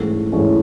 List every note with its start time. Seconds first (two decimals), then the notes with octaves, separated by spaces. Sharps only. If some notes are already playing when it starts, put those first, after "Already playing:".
Already playing: G#2 E3 A3 C#4
0.32 G#2 E3 A3 C#4